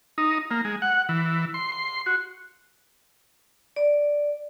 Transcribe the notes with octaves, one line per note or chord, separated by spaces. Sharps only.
D#4
A#3
G#3
F#5
E3
C6
C6
F#4
D5